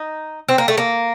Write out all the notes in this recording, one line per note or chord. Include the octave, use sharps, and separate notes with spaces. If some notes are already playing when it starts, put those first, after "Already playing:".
Already playing: D#4
C4
A#3
A3
A#3